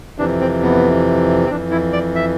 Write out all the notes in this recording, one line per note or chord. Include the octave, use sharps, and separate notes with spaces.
F2 C3 E3 D4
C4
B3
C4
F2 E3 D4
E4
D5
E5